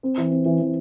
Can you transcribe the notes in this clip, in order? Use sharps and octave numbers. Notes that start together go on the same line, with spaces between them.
C4
E3
C4
E3
E3